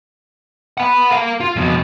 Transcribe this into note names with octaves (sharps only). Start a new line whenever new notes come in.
F#5 B5
A#4 F5
F4
F2 B2